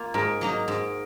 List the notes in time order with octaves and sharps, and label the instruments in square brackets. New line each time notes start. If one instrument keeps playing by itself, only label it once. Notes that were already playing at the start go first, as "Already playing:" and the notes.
Already playing: [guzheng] A#3 F4
[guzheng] G#2 [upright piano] A#4
[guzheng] F#3 A#3 D#4
G#2